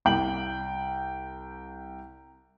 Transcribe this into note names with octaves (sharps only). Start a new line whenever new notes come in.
C2 G5 F#7